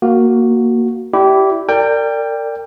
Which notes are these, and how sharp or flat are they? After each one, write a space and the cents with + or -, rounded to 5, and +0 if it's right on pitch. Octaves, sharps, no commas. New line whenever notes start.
A#3 +0 F#4 +0
E4 +0 G4 -20 D5 +5
A#4 -35 D5 +0 G5 +15